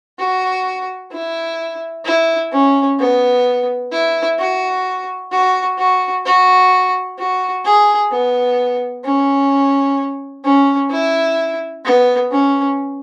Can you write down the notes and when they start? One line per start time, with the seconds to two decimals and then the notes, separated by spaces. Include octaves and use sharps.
0.19 F#4
1.12 E4
2.05 E4
2.52 C#4
2.99 B3
3.92 E4
4.39 F#4
5.31 F#4
5.78 F#4
6.25 F#4
7.18 F#4
7.65 G#4
8.11 B3
9.04 C#4
10.44 C#4
10.90 E4
11.85 B3
12.31 C#4